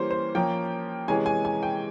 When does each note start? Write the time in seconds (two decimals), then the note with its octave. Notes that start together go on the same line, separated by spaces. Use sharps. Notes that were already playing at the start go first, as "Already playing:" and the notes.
Already playing: E3 G3 A#3 C#4 C5
0.11 C5
0.35 F3 A#3 C#4 G5
1.08 C3 E3 G#3 C#4 G#5
1.26 G#5
1.45 G#5
1.63 G5